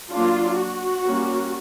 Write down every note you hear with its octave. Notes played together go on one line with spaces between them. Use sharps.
F#3 A#3 D4 F4
F#4
G3 A#3 C#4